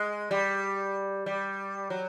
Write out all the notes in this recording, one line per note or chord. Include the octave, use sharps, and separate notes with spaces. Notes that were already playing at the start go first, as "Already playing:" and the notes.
Already playing: G#3
G3
G3
F#3